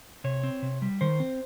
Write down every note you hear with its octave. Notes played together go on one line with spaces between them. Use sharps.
C3 C#5
C4
C3
G3
D#3 C5
C4